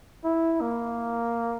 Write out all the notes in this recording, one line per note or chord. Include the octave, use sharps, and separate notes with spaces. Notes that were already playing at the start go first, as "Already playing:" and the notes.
E4
A#3